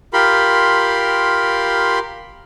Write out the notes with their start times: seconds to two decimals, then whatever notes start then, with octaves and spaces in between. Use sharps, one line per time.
0.13 F4 G4 A#4 B5 C6